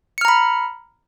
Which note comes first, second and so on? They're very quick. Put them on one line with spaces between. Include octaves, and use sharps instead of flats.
C#7 F6 A#5 B5